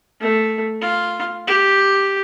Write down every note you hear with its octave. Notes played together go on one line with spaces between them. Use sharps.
A3
F4
G4